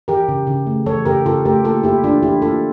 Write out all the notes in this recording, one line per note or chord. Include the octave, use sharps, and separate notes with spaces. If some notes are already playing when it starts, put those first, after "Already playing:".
E3 G4 A#4
C#3
C#3
A3
E3 A4 C#5
C#3 G4 A#4
C#3 F4 A4
A3 G4 A#4
A#3 F4 A4
A#3 E4 G4
E3 D4 F4
E3 E4 G4
A#3 F4 A4